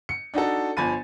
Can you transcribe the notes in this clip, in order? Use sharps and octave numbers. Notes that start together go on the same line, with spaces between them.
C#7
D4 D#4 F#4 A4
G1 F3 G#5 B5 A6 D#7